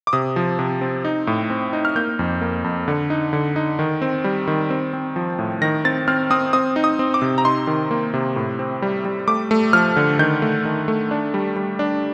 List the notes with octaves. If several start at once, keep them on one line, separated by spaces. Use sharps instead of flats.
D6
C3 D#6
F3
C3
C4
D#4
A2
C4
D#4
F6
A#3 G6
F2
A#3
F2
D3
D#4
D3
D#4
D#3
C4
G3
D#3
C4
C4
F3
A2
D#3 A#6
C4 A6
C4 F6
C4 D#6
C4 D#6
D#4
D#6
C4
D6
C3
A#5
D#4 C6
D#3
A#3
C3
A2
C4
G3
G3
A3 D6
A3
F3 F6
D3
D#3 G6
A3
D#3
A3
D4
G3
G3
D4